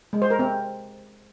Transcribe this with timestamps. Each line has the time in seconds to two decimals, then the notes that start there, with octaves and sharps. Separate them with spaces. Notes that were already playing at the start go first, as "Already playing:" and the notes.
0.13 G#3
0.22 C5
0.30 A#4
0.39 C4